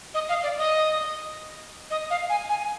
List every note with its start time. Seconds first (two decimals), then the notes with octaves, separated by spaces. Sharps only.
0.14 D#5
0.29 F5
0.43 D5
0.58 D#5
1.90 D#5
2.10 F5
2.30 G#5
2.49 G#5